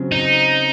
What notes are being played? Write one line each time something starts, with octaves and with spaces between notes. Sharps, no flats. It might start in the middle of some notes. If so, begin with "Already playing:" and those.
Already playing: C#3 F#3 C4
D#4